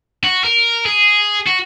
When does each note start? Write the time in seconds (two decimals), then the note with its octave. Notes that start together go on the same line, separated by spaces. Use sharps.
0.24 F#4
0.44 A#4
0.86 G#4
1.47 F#4